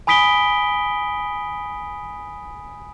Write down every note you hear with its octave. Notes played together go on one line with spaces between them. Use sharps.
G#5 B5 D#6 B6 D7 G7